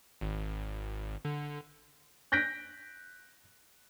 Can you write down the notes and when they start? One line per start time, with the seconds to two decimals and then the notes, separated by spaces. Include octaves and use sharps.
0.21 G#1
1.25 D3
2.32 F#6 G6 A#6 B6 D7